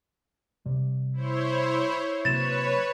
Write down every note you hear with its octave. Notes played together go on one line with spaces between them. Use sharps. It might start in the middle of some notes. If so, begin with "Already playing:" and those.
C3 G3
E4 C5 C#5
C3 F#3 A#3 B4 C#5 A6 E7